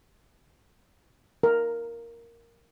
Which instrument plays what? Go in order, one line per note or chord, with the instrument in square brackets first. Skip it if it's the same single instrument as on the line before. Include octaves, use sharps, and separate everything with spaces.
[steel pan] A#4